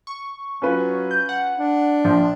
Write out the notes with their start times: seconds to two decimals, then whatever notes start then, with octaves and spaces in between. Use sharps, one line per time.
0.07 C#6
0.62 F#3 C#4 F4 B4
1.11 G6
1.29 F#5
1.58 D4
2.05 A#1 F3